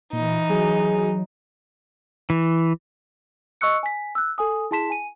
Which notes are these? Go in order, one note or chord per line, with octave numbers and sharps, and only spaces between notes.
A#2 E3 D#4
F#3 G#4
E3
D#5 C#6 E6 F#6 C#7
G#5 B6
E6 F#6
A4 G#5 D#6
E4 G#4 A5 C6 B6 E7
G#5 D#7